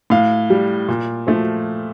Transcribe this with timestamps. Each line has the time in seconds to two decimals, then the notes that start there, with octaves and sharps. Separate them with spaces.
0.10 A2 F5
0.50 G3
0.88 A#2
1.27 F3 A3